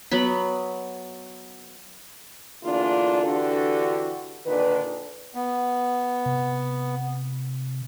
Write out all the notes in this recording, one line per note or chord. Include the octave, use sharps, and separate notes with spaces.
F#3 B3 B5
E2 D3 A#3 D4 F4
D3 E3 D4 F#4 G4 A4
A#2 D3 D#3 D4 B4
B3
C3